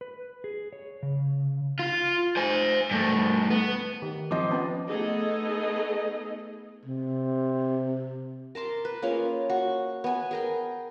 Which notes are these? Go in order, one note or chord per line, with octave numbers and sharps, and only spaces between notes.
B4
G#4
C#5
C#3
F4
C5 G#5
G2 A3
B3
D#3 G4
F3 C4 D#5 D6
B3 C#4 A5 D6
A3 B3 D#4 G#4 A4 D#5
C3
A#4 A5 C6 D6
B4
A#3 C#4 F4 G#4
F#4
B3 G#5
G#4 A#4 G5